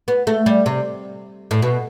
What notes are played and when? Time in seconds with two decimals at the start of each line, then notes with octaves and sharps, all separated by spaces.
0.08 B3
0.27 A3
0.46 G3
0.66 C3
1.51 A2
1.62 B2